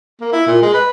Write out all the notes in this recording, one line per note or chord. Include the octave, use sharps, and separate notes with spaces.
A#3
E4
A#2
G#3
B4